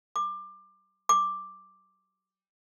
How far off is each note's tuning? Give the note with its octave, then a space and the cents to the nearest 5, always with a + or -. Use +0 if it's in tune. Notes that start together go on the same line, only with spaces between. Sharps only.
D6 +20
D6 +5